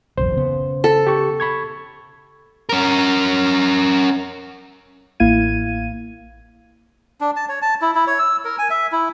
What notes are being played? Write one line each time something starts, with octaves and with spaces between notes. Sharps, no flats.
F#1 B1 E2 C5
C#3 B3
A4
G4 C#6
B5 C#6 G#6
C#4 A#4
A1 A#3 E4 F5 G#6 D#7
D4
A5
C#5
A5
E4
E4
C#5
E6
A#4
G#5
E5
E4